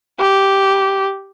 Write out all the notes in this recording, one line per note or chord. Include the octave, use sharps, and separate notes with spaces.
G4